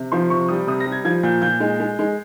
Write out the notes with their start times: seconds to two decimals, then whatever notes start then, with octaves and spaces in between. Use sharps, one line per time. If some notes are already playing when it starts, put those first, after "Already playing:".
Already playing: C3
0.12 F3 C6
0.30 C3 C#6
0.49 G3 D#6
0.67 C3 D#6
0.80 A#6
0.86 G3
0.92 G#6
1.04 F3 G#6
1.23 A#2 G6
1.42 A#2 G6
1.60 G#3
1.80 G#3
1.99 G#3